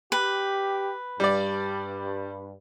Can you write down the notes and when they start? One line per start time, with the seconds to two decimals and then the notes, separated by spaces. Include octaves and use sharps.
0.12 G4 B4
1.20 G2 G3 D5